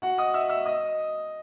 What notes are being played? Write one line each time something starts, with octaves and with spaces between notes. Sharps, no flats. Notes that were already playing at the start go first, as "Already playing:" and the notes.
F#4 F#5
D#5 D#6
E5 E6
E5 E6
D#5 D#6